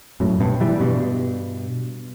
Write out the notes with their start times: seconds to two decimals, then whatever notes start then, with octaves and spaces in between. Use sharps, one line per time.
0.20 F#2 A2
0.40 G2 B2
0.60 E3 G3
0.81 G2 B2